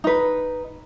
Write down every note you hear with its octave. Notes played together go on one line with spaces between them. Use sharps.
D#4 B4